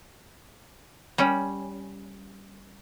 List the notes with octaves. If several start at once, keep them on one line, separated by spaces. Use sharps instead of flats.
G3 C#4